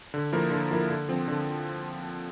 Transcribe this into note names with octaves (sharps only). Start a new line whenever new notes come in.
D3
F3 A#3 E4 A#4
D3
F3 A#3 E4 A#4
D3
F3 C4
D3